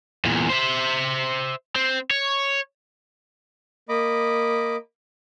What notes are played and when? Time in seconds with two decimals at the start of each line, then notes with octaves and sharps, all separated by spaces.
0.25 E2 A#2
0.50 C5 E5
1.75 C4
2.10 C#5
3.89 A#3 D#5 B5 D6